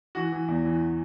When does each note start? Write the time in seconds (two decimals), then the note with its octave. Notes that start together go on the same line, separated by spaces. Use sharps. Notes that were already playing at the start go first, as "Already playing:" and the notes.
0.15 E3 F#4
0.32 E3
0.48 E2
0.65 E3